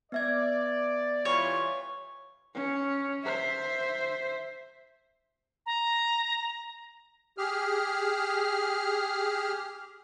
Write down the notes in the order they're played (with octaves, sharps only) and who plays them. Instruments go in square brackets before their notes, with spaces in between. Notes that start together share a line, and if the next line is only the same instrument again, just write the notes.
[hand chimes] B3 E5 G#6 [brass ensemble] D5
[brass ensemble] E3 G3 F4 [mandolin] C#5
[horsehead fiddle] C#4
C5 E5
[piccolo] A#5
[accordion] G4 G#4 F6